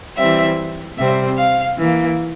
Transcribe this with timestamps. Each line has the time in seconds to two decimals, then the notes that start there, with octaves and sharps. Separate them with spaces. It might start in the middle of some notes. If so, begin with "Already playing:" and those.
0.17 E3 G3 C4 E5
0.97 C3 G3 C4 E5
1.37 F5
1.77 E3 A#3